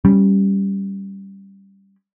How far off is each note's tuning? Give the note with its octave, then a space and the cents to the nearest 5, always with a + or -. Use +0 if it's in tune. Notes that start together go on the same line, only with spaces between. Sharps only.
G3 +0 C#4 +0